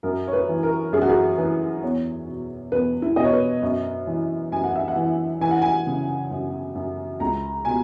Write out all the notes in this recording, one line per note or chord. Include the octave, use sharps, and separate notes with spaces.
F#2 A#4
C#5
B4
E3
A#4
F#2 G#4
F#4
G#4
E3 B4
E2 C#5
B2
E2 B4
E4
B2 D#5
C#5
B4
F#2
E3
F#2 G#5
F#5
E5
F#5
E3
E3 G#5
F#5
G#5
C#3
F#2
F#2
C#2 A#5
B2 G#5